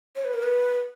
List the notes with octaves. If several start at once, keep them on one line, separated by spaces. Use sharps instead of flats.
C#5
B4
A#4
B4